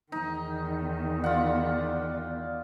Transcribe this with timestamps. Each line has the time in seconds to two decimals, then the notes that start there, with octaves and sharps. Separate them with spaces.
0.12 E2 D#3 D#4
1.24 F4 D5 F#5